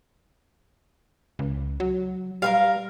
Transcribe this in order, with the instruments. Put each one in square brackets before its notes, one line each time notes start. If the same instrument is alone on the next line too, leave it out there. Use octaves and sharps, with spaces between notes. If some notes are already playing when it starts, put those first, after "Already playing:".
[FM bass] C#2
F#3
[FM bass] G3 [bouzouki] A#4 B4 F5